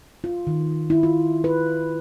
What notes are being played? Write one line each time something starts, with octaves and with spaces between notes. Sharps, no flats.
F4
D#3
E4
F4
B4